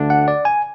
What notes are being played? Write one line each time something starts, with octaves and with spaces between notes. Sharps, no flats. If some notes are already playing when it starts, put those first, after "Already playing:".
Already playing: D2 D3 A3 D4
F#5
D5
G#5